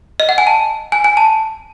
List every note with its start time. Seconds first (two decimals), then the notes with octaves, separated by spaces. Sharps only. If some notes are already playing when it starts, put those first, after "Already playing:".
0.20 D#5
0.29 F#5
0.38 G#5
0.47 A5
0.92 G#5
1.04 G#5
1.17 A5